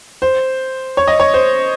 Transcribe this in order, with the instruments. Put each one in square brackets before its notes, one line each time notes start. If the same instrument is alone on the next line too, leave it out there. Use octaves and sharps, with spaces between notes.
[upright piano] C5
C#5
D#5
C#5
C5